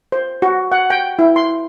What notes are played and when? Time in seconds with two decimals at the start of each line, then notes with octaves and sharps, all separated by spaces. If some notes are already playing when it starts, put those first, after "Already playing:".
0.12 C5
0.42 F#4
0.72 F#5
0.90 G5
1.19 E4
1.36 C6